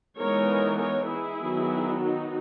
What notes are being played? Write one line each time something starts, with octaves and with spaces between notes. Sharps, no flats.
E3 G#3 B3 D#4 A#4 C#5
A#4 C#5
E4 G#4
D#3 F#3 B3
D#4 F#4